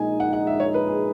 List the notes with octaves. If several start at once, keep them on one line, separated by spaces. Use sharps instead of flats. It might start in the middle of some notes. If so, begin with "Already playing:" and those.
Already playing: A#1 A#2 G#3 D#4 G#5
F#5
F#5
E5
C#5
B4
G#4